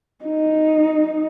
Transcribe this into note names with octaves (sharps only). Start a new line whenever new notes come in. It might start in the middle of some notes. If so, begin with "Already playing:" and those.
D#4